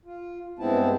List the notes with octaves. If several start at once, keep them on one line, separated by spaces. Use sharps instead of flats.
F4
G2 G#3 B3 C4 E4 A5